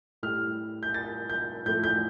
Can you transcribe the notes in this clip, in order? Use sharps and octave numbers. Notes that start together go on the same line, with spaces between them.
A2 G3 F6
G6
A6
G6
A2 F3 A3 G6
G6